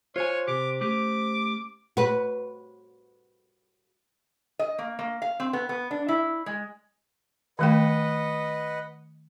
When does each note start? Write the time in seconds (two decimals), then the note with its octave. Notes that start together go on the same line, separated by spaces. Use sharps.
0.16 F4 C5 C#5 G#5
0.47 C3 G4 D6
0.81 A3 C#4 G4 D6
1.97 F#4 B4
4.59 D#5
4.78 A#3
4.99 A#3
5.22 F5
5.40 C4
5.53 B3
5.69 B3
5.91 D4
6.08 E4
6.46 G#3
7.59 D#3 A3 B4 D#5 F#5 G5